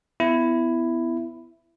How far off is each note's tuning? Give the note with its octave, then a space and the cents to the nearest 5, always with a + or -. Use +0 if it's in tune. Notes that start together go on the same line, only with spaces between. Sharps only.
B3 +25 E4 +10